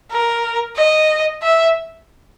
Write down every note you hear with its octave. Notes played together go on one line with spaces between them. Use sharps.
A#4
D#5
E5